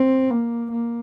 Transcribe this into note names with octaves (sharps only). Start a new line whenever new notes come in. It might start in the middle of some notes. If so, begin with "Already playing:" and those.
Already playing: C4
A#3
A#3